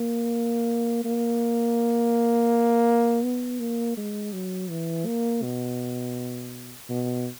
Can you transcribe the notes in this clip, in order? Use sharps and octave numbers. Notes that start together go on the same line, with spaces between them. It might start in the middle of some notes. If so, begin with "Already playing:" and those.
Already playing: A#3
A#3
B3
A#3
G#3
F#3
E3
A#3
B2
B2